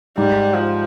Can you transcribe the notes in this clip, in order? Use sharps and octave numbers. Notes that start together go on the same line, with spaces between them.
G#2 G3
F3